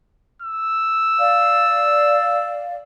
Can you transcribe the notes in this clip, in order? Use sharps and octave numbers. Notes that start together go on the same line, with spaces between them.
E6
D5 F5